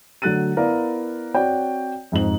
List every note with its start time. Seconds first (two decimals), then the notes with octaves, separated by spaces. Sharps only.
0.22 D3 F#3 A3 F#6 A6 D#7
0.57 B3 E4 A#4 D5 F5
1.34 C4 F#4 C#5 D5 G5
2.12 F2 G#2 D#4 F#7